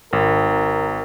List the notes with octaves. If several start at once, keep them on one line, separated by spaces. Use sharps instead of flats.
G#1 A#4